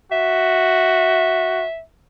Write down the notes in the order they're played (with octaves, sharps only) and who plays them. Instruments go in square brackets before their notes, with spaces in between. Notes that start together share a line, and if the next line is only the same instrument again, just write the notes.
[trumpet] F#4 [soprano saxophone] E5